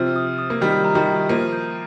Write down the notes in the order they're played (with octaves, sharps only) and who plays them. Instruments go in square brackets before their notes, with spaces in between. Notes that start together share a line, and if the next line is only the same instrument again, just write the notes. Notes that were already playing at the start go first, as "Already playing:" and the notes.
Already playing: [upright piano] C3 F3 [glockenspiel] F6
[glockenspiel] D#6
D#6
[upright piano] A#3
[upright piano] D#3 G3 [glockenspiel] F6
[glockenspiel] A#5
[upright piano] D#3 G3
[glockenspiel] A#5
[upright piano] F3 A#3 [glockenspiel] D#7
[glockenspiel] G6